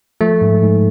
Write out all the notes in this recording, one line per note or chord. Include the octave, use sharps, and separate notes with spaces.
F3 A3
G#2
G#2